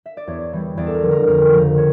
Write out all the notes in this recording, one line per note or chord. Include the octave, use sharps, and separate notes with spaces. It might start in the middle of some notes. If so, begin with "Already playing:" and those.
E5
D5
E2 C#5
E3 G3
E2 D5
A4
A#4
D3 F3
A#4
F2 A#4
C#3 F3 A#4
C#5